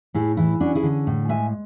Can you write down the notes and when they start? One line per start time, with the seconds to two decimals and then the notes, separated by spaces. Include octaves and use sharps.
0.14 A2 E4 G#4
0.37 E3 E4
0.60 C#4 D4 F#4
0.75 E4 G#4
0.83 D3
1.07 A2
1.29 G#3 E5 G#5